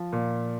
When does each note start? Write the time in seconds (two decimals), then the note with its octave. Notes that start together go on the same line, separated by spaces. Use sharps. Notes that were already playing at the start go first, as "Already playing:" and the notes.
Already playing: F3
0.13 A#2